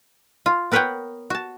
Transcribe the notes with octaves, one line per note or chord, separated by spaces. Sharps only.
F4
B3 A#4 B4 C#5 F#5 G5
F#4 A5